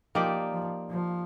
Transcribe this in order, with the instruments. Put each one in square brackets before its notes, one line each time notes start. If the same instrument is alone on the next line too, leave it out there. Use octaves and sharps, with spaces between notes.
[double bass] F3 [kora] A#3 D#4 G4 D5
[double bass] F3
F3